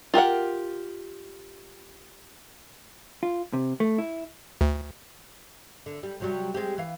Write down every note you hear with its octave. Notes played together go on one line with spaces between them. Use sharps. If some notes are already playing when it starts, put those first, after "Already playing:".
F4 G4 A#4 F#5
F4
C3
A3
E4
D2
D3
G3
C3 F#3 G3
G#3 C4 G4
E3 F5